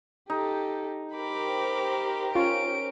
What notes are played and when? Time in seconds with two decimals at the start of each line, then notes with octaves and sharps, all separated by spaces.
0.30 D#4 G4 A4
1.16 G4 A#4 C5 B5 D6
2.35 C#4 F4 D7